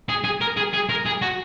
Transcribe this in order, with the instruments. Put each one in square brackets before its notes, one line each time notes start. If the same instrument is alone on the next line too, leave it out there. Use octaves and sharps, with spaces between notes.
[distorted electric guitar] G#4
G#4
A#4
G#4
G#4
A#4
G#4
F#4